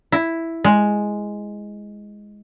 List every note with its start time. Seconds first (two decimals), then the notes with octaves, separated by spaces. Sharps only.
0.12 E4
0.64 G#3